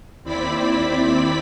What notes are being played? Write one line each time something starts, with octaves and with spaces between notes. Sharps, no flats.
D#2 C4 E4 D5 B5 B6